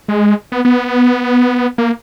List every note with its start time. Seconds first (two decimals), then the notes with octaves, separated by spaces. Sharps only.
0.08 G#3
0.52 B3
0.65 B3
1.78 A#3